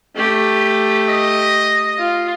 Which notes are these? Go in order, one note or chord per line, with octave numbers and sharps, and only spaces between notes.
A3 G4
D#5
F4